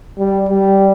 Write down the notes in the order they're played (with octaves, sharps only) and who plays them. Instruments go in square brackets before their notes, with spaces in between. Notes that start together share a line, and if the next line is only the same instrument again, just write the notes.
[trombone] G3
G3